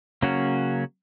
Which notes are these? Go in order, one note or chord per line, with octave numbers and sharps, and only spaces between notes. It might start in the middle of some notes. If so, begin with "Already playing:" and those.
C#3 F#3 A#3 C#4 F#4